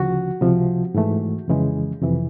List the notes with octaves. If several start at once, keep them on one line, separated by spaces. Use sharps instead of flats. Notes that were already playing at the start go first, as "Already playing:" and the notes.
Already playing: D2 C#3 F3 F#4
C#2 C3 F3
G#2 E3 A3
F2 C#3 E3 G#3
F2 C3 E3